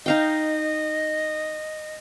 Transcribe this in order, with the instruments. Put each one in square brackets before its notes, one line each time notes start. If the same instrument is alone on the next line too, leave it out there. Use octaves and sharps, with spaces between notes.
[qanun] D#4 F5 G5 [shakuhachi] D#5